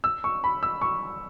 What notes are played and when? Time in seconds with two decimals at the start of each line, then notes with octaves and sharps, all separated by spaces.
0.04 E6
0.24 C#6
0.44 B5
0.63 E6
0.81 C#6